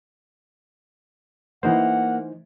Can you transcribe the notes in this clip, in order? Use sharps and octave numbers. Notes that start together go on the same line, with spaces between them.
E3 A#3 D#4 C5 F#5